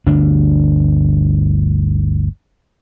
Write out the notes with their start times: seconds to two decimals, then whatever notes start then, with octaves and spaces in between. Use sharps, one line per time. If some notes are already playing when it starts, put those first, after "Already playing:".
0.06 G1 D2 D4